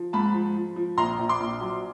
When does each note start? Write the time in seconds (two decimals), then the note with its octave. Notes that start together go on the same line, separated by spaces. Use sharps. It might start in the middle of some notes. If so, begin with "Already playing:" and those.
Already playing: F3
0.13 G#2 A5 B5
0.34 F3
0.56 F3
0.76 F3
0.97 A#1 A#5 C6
1.19 A#1
1.29 C6 D6
1.40 A#1
1.61 F#3